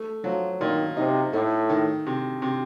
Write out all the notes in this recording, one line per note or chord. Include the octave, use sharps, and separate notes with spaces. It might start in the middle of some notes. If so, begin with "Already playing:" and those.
Already playing: A3
F3 F#3
A#2 D#3
C3 D#4
A2 A3
D#3
C3
C3